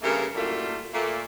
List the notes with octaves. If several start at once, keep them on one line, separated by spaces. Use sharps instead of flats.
G2 C#3 A3 A#3 A#4
F#2 A2 G3 A3 A#3 F4
A#2 A3 A#3